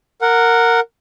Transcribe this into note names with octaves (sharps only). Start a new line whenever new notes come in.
A#4 F#5